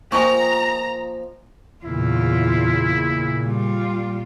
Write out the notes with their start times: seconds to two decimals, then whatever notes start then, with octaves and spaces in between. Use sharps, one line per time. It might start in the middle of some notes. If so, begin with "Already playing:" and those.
0.12 F3 A#3 F4 D#5 G5 G#5 A#5 C#6
1.85 E2 A#2 C#3 E4 F4
3.46 G3 F4